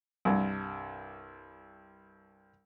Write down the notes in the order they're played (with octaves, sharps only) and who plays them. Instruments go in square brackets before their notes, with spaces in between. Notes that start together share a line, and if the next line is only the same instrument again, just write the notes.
[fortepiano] C2 G2